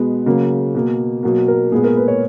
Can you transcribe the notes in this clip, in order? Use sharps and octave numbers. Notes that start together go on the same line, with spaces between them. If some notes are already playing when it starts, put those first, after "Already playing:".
Already playing: B2 G#3 B3
C#3 F#3 A#3
B2 A#3
B2 F#3 A#3
A#4
A#2 G#3 B3 G#4
A#4
B4
C#5